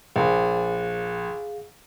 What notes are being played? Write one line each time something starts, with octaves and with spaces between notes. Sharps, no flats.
A#1 G#4 F5 F#5